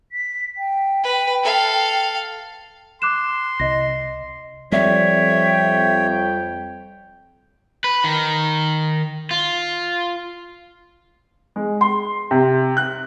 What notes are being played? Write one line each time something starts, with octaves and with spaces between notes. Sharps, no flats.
B6
G5
B4
A4 F5
C6 D6 F#6 E7
C2 D#5 A#6
F2 G3 C#5 E5 G5
B4
D#3
F4
G#3
C6
C3
F#6